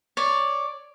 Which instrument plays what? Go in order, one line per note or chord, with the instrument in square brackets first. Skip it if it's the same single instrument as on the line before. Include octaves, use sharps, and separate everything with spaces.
[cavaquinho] C#5 D5